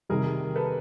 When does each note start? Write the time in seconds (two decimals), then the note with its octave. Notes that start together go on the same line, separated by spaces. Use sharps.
0.09 C3 D#3 G3 G#4 A#4
0.55 A4 B4